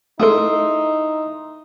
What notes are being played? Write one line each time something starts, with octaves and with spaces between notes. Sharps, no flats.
A3 D#4 E4 G#4 A4 C6 D#6